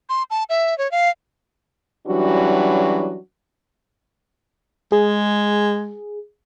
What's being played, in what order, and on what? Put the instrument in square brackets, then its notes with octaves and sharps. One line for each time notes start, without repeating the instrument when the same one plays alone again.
[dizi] C6
A5
E5
C#5
F5
[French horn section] E3 F#3 G3 C#4 D4 F#4
[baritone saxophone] G#3 [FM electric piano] G#4